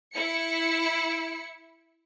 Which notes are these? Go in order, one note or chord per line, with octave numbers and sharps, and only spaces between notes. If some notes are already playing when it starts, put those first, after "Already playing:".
E4 C#7